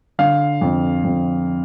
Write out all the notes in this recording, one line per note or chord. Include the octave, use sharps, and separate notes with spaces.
D3 F5
F2
F2